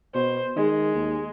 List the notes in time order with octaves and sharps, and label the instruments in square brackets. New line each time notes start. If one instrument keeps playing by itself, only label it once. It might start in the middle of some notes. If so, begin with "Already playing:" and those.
[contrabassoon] B2 [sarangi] C5
[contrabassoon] D#3 [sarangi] G#3
[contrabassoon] D#2